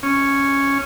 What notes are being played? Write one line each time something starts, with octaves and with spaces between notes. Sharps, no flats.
C#4